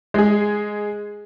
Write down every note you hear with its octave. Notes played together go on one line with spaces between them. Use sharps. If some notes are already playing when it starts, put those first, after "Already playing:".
G#3 G#4